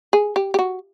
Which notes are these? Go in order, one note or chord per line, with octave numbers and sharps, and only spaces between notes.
G#4
G4
G4
F#4